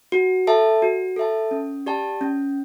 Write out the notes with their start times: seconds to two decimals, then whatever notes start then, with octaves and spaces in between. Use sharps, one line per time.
0.12 F#4
0.47 A4 E5 A5
0.82 F#4
1.16 A4 E5 A5
1.51 C#4
1.86 G4 D5 A5
2.21 C#4